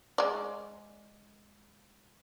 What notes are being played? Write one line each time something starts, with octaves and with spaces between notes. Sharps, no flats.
G#3 D5